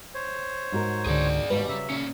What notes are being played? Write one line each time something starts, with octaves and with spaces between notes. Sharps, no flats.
C5 C#5
G#2 F#4 A#4
C#2 D3 G#4 D5
D#2 G#2 B2 G3 B4
C#3 F#3 E5
A#2 C#4